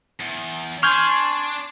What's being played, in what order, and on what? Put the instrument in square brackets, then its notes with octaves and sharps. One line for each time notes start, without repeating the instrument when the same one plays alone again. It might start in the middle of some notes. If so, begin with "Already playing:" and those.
[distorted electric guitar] E2
[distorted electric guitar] D4 [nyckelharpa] G#5 C6 [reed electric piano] C#6 [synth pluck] F6 G6 G#6